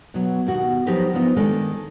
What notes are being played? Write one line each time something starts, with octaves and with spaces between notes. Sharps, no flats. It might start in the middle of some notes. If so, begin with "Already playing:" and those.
B2 F#3
D#2 B2 F#4
F3 F#3 D#4 G4 A#4 B4
F3 B3 D4 D#4 F4
D#3 G#3 A#3 D4 A4